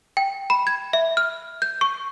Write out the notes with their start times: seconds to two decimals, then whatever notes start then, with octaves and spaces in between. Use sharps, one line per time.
0.17 G5
0.50 B5
0.67 G#6
0.93 E5
1.17 F6
1.62 G6
1.81 C#6